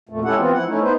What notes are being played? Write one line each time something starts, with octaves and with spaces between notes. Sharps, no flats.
F2 A#2 A3
G#3 C#4 E4 G4 A4 F#5
E3 B3 C4 F4
F3 E4 F#5
A3 C#4 D#4 E4
B3 D#4 B4 C5